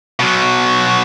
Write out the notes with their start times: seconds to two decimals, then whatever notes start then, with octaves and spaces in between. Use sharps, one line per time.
0.19 B2 F#3